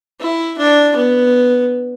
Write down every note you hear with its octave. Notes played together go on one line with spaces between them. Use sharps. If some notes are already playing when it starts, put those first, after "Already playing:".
E4
D4
B3